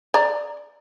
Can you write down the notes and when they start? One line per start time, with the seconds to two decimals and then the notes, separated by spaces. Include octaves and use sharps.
0.14 D5 A#5